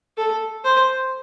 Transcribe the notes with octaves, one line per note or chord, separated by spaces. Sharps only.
A4
C5